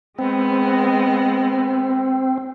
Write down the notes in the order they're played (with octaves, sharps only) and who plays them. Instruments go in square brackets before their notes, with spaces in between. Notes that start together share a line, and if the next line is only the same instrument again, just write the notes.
[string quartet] G#3 B3 [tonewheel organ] C4